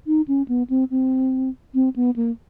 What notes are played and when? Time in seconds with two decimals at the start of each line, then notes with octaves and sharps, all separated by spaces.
0.07 D#4
0.28 C#4
0.48 B3
0.70 C4
0.91 C4
1.75 C4
1.96 B3
2.16 A#3